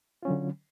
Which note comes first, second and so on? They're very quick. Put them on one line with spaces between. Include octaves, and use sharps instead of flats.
F4 C#4 F#3 D3